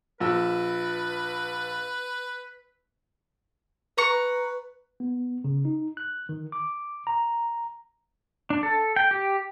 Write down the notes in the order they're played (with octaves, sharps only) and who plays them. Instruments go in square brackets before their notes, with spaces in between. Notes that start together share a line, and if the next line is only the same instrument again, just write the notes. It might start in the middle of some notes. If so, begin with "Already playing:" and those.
[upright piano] A#1 E6 [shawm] B4
[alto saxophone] B4 [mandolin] A#5 C#6
[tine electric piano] B3
C#3
D#4
F#6
D#3
D6
A#5
[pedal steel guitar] D4
A4
G5
G4